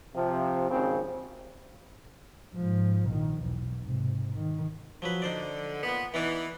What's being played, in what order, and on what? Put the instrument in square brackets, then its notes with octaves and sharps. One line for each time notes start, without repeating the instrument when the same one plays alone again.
[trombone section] C3 F3
G#1 C#3 C4 C5
[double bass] G#2 F3
A#1 D#3
B1 E2
G#2 C3
D#3
[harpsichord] F3 F#3 B4
[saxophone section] D3 [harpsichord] D#4 C5 D5
[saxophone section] A#2 B3
[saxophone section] E3 [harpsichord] B3 D#4 D5